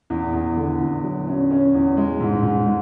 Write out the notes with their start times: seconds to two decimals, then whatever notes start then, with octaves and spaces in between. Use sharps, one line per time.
0.10 E2
0.33 E2
0.57 D3
0.80 E2
1.03 F#3
1.28 C#4
1.51 C#4
1.74 E2
1.97 G#3
2.20 G#2
2.43 G#2
2.66 G#3